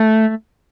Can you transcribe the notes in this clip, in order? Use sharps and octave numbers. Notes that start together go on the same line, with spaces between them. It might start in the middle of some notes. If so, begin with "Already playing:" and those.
Already playing: A3